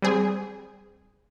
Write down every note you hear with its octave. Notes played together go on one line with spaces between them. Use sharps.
G3 C4 G#4